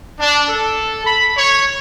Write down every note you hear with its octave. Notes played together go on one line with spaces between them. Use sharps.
D4
A4
B5
C#5